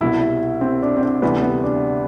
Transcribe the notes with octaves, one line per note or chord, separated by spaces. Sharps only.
C2 B2 G3 E4
E4
C4
D4
C4
D4
D2 C3 E3 G3 B3
B3
D4